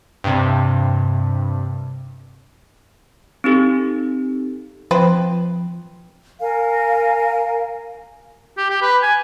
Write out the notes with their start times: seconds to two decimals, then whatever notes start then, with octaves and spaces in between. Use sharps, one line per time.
0.24 G2 C3
3.44 C4 D#4 G4 A4
4.91 F3 C4 B4
6.41 A#4 F5 G#5
8.58 G4
8.70 G4
8.82 B4
9.03 G#5